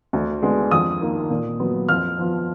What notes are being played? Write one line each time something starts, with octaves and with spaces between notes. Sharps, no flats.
D2
D3 G#3 B3
F2 D#6
D#3 A#3
A#2
F#3 B3
F2 F6
F3 B3